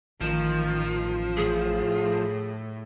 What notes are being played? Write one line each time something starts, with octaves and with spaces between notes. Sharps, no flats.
A1 D#3 F3
A2 G#4